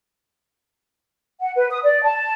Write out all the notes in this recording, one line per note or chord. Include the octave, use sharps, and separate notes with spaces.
F#5
B4
D#6
D5
A5